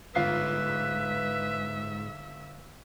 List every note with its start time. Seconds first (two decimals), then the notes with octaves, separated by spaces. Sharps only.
0.15 G1 G#2 F4 B4 E5 C7